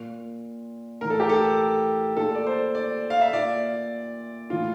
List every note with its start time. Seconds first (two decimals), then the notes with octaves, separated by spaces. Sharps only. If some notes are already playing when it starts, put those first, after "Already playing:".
Already playing: A#2
1.01 A2 E3 A#4
1.10 A4
1.20 G4
1.29 A4
2.17 A#2 A4
2.35 D5
2.46 C5
2.75 D5
3.10 F5
3.21 E5
3.33 A#2 D5
4.50 A2 E3 F4